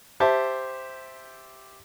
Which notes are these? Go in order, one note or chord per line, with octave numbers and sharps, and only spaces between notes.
G4 C5 E5 A5